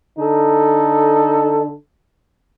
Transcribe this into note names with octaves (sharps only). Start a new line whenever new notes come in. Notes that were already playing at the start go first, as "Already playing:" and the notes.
D3 D#4 A4